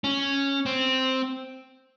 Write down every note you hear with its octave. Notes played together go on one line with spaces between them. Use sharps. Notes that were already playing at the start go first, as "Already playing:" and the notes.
C#4
C4